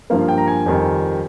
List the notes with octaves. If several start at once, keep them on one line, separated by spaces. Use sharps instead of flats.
G2 F3 A#3 F5
G5
A#5
G#5
F2 D#3 G3